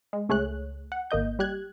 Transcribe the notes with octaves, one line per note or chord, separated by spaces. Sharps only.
G#3
C#2 A3 G#4 C#5 F#6
F#5
G#1 A#3 D#5 G6
G3 G4 F#6 G#6